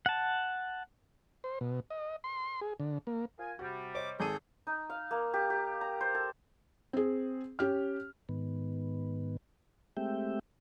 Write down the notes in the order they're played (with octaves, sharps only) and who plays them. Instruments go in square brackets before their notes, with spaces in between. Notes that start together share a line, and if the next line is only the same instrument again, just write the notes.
[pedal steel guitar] F#5 A5
[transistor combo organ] C5
B2
D#5
C6
G#4
D3
A#3
[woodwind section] F4 A#4 G#5
[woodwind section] C3 G3 [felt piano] F#4
[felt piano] C5 C#5 D#5 [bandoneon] D6
[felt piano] G#1 D#7 [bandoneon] G#4 A4 G6
[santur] D#4
F5
A#3
G4
G4
A#5
C5
A4
[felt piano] C4 G#4
C#4 G4 F6
[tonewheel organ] G#2 D#3 B3
G#3 A3 C4 G4 E5 G5